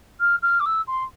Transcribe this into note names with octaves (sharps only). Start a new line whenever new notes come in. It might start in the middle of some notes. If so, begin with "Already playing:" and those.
F6
F6
D6
E6
C6